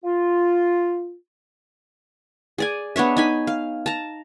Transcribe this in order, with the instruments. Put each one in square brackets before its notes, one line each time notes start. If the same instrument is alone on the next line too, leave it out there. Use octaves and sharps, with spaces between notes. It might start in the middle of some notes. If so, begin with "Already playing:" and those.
[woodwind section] F4
[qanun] G#4 D5 G#5
B3 D4 C#5 E5
D#4 G#5 B5
F5
A5 A#5